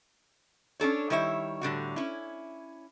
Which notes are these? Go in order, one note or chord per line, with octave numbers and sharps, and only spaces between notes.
C#4 D4 A4 C#5
D#3 G3 E4 C#5 D#5 E5
A2 D3 G3 F#4
C#4 E4